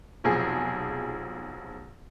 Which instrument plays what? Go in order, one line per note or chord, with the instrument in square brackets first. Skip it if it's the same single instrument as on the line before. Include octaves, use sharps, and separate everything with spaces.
[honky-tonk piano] F1 B1 F3 G#4